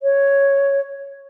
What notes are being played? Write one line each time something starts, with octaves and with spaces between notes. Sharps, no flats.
C#5